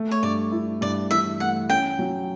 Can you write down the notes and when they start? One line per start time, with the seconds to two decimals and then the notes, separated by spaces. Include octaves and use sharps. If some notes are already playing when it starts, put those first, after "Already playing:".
Already playing: A3
0.11 C#5
0.22 G2 D5
0.52 E4
0.81 G2 D5
1.11 E3 E5
1.40 A3 F#5
1.69 C#4 G5
1.99 F#3